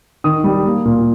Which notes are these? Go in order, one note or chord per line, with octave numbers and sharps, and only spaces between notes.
D#3 D#6
G3
A#3
A#2